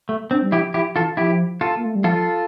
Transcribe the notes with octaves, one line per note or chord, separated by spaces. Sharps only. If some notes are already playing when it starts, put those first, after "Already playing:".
A3
C4 D4
G3
F3 E4 G4
F3 E4 G4
E3 F4 A4
F3 E4 G4
F4 A4
A#3
A3
G3
F3 F4 A4